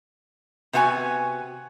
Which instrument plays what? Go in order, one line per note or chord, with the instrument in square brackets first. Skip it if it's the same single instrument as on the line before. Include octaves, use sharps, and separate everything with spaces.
[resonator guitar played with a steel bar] C3 B3 F#4 A#4 G#5